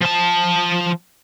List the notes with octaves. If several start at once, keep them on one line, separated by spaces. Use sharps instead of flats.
F3 A5